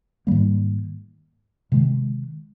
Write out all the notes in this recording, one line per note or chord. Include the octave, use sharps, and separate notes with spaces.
G#2 D#3 G3 A#3
C3 D#3 G#3